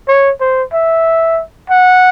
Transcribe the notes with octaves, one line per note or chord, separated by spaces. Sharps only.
C#5
C5
E5
F#5